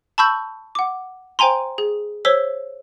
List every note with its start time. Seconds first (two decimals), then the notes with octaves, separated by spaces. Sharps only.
0.18 A5 B5 C#6 E6 G6 F#7
0.75 F#5 D6
1.39 C5 G5 G#5 A#5 C6
1.78 G#4
2.25 C5 C#5 E6 B6 G7